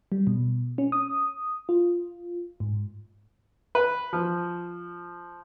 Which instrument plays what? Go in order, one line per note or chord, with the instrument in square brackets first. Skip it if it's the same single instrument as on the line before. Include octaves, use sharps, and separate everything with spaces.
[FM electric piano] G3
B2
C#4
D#6
F4
G#2
[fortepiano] B4
F3